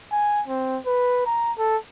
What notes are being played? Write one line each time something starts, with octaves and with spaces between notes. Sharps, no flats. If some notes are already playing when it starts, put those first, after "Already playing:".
G#5
C4
B4
A#5
A4